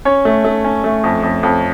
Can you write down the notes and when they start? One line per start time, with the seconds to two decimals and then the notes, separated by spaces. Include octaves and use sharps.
0.05 C#4 C#5
0.25 A3
0.44 A3
0.64 C#4
0.84 A3
1.04 F2
1.23 F2
1.43 F2